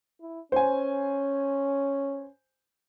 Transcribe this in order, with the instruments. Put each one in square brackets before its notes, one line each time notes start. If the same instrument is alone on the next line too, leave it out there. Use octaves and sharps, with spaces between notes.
[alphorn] E4
[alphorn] C#4 [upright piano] C5 G#5